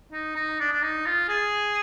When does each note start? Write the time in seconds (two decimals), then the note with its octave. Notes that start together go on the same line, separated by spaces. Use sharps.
0.12 D#4
0.35 D#4
0.60 D4
0.73 D4
0.83 D#4
1.06 F4
1.28 G#4